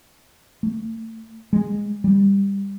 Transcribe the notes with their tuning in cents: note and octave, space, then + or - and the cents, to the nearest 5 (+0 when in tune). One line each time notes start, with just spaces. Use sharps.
A3 +30
G#3 -15
G3 +15